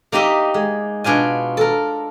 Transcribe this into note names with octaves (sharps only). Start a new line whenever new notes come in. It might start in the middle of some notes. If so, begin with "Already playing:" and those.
A#3 D#4 G4 D#5 E5
G#3
B2 D4 F4 G#5
A4 A#4